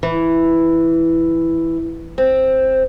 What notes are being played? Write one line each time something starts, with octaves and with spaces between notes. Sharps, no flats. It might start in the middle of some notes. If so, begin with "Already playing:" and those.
E3
C4